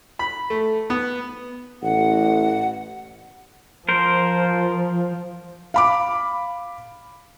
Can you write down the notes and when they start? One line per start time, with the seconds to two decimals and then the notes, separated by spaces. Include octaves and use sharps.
0.19 B5
0.50 A3
0.90 B3
1.83 A1 F#5
3.89 F3 A#4 C5
5.74 F5 B5 D6